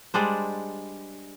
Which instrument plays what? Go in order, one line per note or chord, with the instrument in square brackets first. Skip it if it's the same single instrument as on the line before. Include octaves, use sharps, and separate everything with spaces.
[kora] G3 G#3 D4 C5